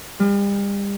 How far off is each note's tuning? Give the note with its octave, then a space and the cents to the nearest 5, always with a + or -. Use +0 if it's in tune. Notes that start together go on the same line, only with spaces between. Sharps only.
G3 +40